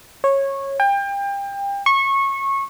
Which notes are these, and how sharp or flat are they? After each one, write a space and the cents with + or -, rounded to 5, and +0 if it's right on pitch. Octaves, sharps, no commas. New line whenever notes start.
C#5 -15
G5 +30
C#6 -20